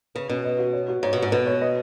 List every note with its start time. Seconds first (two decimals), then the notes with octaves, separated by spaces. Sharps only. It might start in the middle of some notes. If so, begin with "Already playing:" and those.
0.15 C#3 B4
0.29 B2 C#4
0.45 D#5
0.59 F#4
0.73 C#5
0.88 F#4
1.03 G#2 C#5
1.13 B2
1.18 G#2 F#4
1.32 B2 B3
1.47 C#5
1.62 D#5